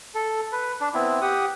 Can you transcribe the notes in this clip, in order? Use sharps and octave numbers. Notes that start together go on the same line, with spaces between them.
A4
B4
D4
B3 C4 E4
G4 F#5 D#6